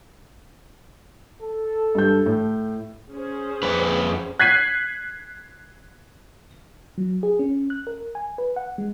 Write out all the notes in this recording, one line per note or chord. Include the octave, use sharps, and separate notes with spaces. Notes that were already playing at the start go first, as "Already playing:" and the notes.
A4
G2 G6
A2
C#4 G#4 C5
F2 B4
F#6 G#6 B6 C7 D#7
F#3
G#4
C#4
F#6
A#4
G#5
B4
F#5
G#3